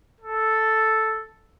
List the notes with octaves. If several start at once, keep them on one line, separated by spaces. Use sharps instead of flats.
A4